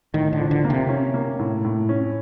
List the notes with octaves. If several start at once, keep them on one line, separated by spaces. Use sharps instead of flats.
A2 D#3
D3
F3
D3
A#3
C3
C#4
A#3
A2
A2
C#4